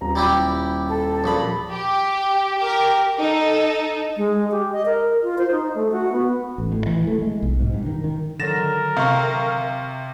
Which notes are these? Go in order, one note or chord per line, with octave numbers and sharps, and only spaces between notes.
D#1 A#5
G3 E4 G4
A4
A#1 A#2 B5
G4
G4 A#4
D#4 A4
G#3
G4
D#5
A#4
F4
C5
D#4
A3
F#4
B3
A1
A2
E3
A3
G#3
B1
G#2
G2
D#3
D#3
D3 D#3 F#3 A#4 A6 A#6 E7
C3 F5 C#6